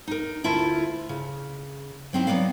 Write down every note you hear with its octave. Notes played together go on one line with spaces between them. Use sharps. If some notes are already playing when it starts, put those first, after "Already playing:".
D#4 A#4
D2 E4 F4 E5 A5
C#3
F#3 C4 D#4 E4
F#3 A3 B3 D5 F5